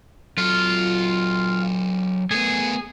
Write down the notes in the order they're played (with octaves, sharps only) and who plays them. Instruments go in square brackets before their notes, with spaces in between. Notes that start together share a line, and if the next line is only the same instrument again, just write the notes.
[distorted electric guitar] F#3 A4 [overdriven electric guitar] F4
[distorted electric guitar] A3 B3 [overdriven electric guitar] G#4